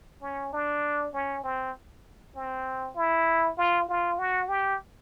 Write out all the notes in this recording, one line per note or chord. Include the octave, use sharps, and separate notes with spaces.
C#4
D4
C#4
C4
C4
E4
F4
F4
F#4
G4